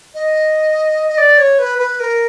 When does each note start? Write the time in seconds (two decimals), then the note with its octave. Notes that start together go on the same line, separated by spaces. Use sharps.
0.14 D#5
1.08 D#5
1.18 D5
1.38 C#5
1.59 B4
1.78 B4
2.00 A#4